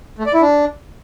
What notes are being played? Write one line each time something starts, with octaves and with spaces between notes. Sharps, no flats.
A3
D5
E4
D4